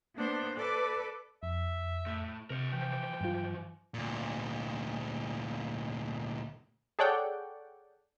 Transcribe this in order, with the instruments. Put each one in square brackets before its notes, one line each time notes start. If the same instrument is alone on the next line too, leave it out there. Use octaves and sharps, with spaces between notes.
[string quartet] A#3 B3 D4 C5
A4 B4 D5 D6
[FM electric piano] F2 [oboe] E5
[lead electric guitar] A2
[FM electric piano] C3 [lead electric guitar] A#4 C#5
[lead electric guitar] E3 F3 [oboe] G5
[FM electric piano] G2 F#3 F4
[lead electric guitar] D2 A#2
[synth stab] G#4 A4 C#5 D5 F#5 G5